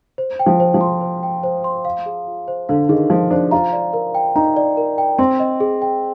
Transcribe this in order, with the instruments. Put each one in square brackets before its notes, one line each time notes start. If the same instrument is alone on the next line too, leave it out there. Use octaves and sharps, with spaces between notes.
[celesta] C5
G5
[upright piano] F3
[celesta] C5
[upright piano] F3
[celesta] C6
C5
G5
C5
C6
F5
G#4
F4
C5
[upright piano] D3 [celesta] F5
[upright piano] D#3 [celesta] G#4
[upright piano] F3 [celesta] F4
[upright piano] D4 [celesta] C5
[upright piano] F4 [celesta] A#5
[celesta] D5
A#4
G5
[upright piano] D#4 [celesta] A#5
[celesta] D5
A#4
G5
[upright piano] C4 [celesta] C6
[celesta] D#5
G#4
G5